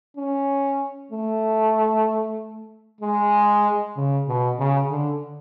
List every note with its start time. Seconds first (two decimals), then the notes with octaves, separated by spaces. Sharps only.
0.17 C#4
1.12 A3
3.01 G#3
3.96 C#3
4.28 B2
4.59 C#3
4.90 D3